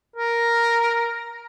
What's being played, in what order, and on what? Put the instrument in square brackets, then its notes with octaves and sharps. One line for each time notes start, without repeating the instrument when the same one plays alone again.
[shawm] A#4